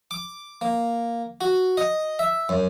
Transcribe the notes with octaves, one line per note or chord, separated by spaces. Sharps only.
D6
A#3
F#4
D#5
E5
F#2